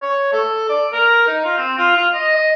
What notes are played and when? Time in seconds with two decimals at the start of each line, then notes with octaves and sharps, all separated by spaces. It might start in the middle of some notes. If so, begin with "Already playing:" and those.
0.03 C#5
0.33 A4
0.69 D5
0.93 A#4
1.27 D#4
1.45 F4
1.57 C4
1.78 F4
1.97 F4
2.14 D#5
2.36 D#5